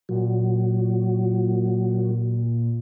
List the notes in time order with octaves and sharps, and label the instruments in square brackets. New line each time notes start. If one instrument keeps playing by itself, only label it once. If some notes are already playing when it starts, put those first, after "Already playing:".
[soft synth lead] A#2 [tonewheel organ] F#3